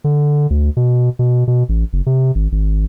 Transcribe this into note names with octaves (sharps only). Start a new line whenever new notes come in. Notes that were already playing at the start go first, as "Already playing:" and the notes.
D3
D2
B2
B2
B2
A1
F#1
C3
G#1
G#1